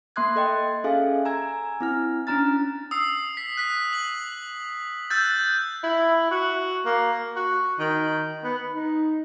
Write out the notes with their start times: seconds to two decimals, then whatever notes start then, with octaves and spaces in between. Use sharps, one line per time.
0.16 A#3 E5 C6 D#6 F#6 G#6
0.36 A4 D#5 G5 C6
0.84 C#4 G#4 A4 E5 F5 G#5
1.25 G#5 A#5 E6 G#6
1.80 C4 E4 F6
2.27 C#4 D4 A#5 F6 A6
2.91 D#6 E6 C7
3.37 B6
3.57 F#6 B6
3.93 F#7
5.10 E6 F#6 G6 A6
5.83 E4
6.31 F#4
6.86 A#3
7.36 F#4
7.79 D#3
8.44 B3
8.72 D#4